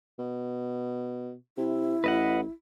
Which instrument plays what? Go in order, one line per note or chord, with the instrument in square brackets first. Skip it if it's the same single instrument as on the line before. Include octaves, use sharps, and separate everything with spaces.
[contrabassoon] B2
[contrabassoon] C3 [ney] E4
[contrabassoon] A1 [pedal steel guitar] B4 D#5 F#5